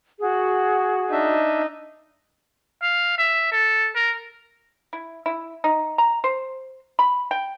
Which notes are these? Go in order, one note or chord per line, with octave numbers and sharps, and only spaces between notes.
F#4 G#4
D4 D#4 E5
F5
E5
A4
A#4
E4
E4
D#4
A#5
C5
B5
G5